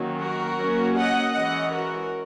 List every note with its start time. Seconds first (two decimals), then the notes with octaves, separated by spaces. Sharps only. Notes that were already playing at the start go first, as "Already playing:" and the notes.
Already playing: D#3 F#3 A#3 C#4
0.22 F#4 A#4
0.59 F#3 A#3 C#4
0.98 D#5 F#5
1.35 E3 G#3 C#4 D#5 F#5
1.73 F#4 A#4